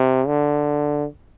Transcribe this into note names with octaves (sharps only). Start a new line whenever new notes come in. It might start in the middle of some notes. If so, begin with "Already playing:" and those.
Already playing: C3
D3